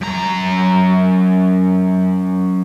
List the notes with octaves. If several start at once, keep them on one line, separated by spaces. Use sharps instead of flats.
F#2 A#5